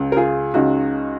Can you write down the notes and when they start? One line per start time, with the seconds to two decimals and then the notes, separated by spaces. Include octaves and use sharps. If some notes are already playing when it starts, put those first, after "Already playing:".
Already playing: C#2 C#3
0.12 A#4
0.17 F4 G#4
0.54 C#2 C#3 D#4 F#4